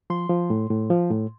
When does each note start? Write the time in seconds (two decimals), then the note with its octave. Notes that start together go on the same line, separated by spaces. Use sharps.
0.10 F3 C6
0.30 F3
0.50 A2
0.70 A2
0.90 F3
1.10 A2